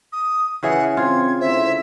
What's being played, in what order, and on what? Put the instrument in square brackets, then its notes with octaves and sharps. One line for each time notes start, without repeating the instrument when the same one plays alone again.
[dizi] D#6
[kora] C#3 E3 G#4 [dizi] F#5
[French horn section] C4 [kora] F4 [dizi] G#6
[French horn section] D2 E4 C5 [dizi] E5